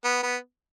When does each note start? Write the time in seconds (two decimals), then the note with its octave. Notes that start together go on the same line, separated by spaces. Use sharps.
0.04 B3
0.23 B3